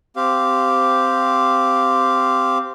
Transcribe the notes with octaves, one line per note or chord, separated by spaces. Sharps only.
C4 G4 F5